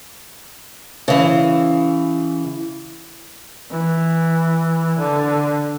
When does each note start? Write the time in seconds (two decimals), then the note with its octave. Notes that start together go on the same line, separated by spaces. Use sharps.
1.08 C#3 E3
3.71 E3
4.99 D3